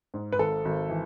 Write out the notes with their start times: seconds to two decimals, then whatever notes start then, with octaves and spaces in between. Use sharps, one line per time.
0.14 G#2
0.32 B4
0.39 G#1 A4
0.65 G#1
0.89 E3